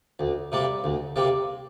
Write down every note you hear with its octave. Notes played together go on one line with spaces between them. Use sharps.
D2
C3 G3 A#3
D2
C3 G3 A#3